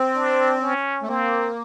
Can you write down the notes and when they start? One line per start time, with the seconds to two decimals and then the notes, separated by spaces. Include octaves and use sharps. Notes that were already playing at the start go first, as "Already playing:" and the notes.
Already playing: C4
0.15 D4
0.62 C#4
1.03 A3
1.08 A#3 C4